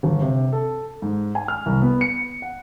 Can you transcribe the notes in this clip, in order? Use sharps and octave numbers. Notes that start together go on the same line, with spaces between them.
G1
C3
A4
G#2
G#5
F6
C2
B3
C#7
F#5